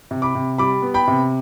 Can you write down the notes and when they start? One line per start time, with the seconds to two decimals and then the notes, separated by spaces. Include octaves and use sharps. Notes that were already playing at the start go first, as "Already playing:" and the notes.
0.11 C3
0.22 B5 D6
0.35 C3
0.58 G3 B5 D6
0.82 B3
0.94 G5 B5
1.07 C3